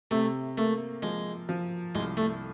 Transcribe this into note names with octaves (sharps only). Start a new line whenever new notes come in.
C3 A3
A3 A#3
F3 G#3
F3
C2 G#3
A3